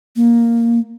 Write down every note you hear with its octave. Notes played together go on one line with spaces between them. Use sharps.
A#3